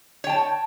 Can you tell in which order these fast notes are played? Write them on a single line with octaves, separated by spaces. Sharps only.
C#5 G5 A5